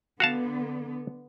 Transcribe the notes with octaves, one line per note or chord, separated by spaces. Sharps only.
D3 B3 F#4 F5 A5